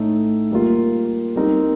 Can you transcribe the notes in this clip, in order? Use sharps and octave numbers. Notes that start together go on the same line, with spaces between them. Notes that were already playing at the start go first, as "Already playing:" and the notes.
Already playing: A2 A3 D#4
G3 A#3 F4
G3 C4 D#4 A#4